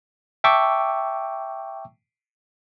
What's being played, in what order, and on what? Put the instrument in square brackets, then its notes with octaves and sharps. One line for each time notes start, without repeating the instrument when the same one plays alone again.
[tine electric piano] E5 G5 A5 C#6 D6 E6